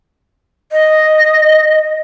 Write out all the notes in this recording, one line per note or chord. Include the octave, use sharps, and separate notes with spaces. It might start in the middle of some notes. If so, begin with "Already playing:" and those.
D#5